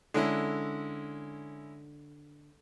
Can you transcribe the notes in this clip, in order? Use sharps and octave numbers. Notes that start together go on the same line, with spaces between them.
D3 G#3 C#4 D4 E4